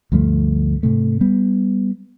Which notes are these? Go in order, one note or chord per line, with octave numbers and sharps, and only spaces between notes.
D2 G2 F3 A3
G#2 C3 A3
G3 B3